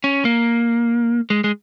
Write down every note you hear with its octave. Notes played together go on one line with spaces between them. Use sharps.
C#4
A#3
G#3
G#3